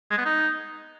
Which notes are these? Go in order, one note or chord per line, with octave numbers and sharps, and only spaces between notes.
G#3
B3
D#4